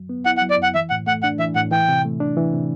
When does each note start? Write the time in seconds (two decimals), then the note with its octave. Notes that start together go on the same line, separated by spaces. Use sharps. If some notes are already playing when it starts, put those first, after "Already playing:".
Already playing: F#2 F#3
0.09 B3
0.26 E4 F#5
0.37 F#5
0.42 F#3
0.50 D5
0.58 F#2
0.63 F#5
0.75 E3 E5
0.90 A2 F#5
1.07 A3 F#5
1.23 D4 F#5
1.39 E3 E5
1.55 A2 F#5
1.71 E3 G5
1.89 C3
2.05 A3
2.20 D4
2.37 E3
2.53 C3